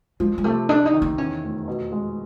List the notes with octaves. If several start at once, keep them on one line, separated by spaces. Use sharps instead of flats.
F3 G#3
G#3
C3 A3
C#4 D4
D#4
D#3
D#4
E2 C#4
F1
B2
G#3